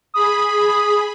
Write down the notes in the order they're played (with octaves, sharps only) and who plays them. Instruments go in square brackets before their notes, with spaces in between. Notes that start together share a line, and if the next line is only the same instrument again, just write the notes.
[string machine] G#4 B5 [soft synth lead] D#6